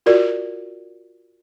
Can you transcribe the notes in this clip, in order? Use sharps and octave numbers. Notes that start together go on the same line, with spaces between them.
F4 F#4 A#4 D5